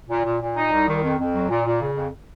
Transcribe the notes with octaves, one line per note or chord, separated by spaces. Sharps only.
A#2
A#2
A#2
D#4
C2
D#3
F2
F2
F#3
A#2
A#2
C#3
F2